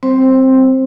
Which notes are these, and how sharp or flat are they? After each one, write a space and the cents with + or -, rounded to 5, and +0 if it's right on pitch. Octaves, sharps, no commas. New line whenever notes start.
G3 -45 C4 +0 C5 +15